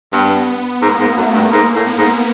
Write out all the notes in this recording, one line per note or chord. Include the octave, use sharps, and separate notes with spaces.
G2 B3
G#2 A#3
G#2
F#2 A3
G2
G#2 A#3
A2
B3
G#2